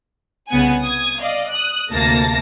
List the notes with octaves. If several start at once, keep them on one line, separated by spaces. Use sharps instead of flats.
C2 C#3 B3 F#5 G#5
D#6 G#6
D5 D#5 F5
D#6 F#6
D2 C3 A#3 A5 A6 A#6